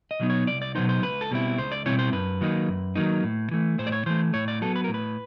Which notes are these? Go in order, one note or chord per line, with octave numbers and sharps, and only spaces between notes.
D#5
B2 F#3 B3 D#4
C#5
C2 D5
D5
B2 F#3 B3 D#4 C5
C5
C#2 B4
A4
B2 G3 C4 E4
C#2 C5
D5
B2 G3 C4 E4 C#5
C5
F#2 B4
D#3 F#3 A#3 D#4
F#2
D#3 F#3 A#3 D#4
A2
E3 A3
A2 C5
D5
C#5
E3 A3 C5
A2 C#5
D5
F#3 B3 A4
B4
A2 A#4
B4